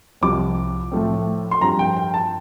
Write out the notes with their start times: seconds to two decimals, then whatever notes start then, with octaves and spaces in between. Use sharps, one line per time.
0.21 C2 C3 F3 C4 D6
0.92 A2 F3 A3 C4
1.51 C6
1.61 G2 F3 C4 A#5
1.79 G5
1.96 G5
2.14 A5